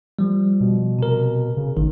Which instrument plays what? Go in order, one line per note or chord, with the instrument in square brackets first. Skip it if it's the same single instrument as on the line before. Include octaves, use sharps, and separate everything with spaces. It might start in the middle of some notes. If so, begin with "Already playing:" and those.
[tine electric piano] F3 G3
[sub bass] B2
[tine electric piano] C3 A#4
[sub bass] C#3
[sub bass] A1 [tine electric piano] D#3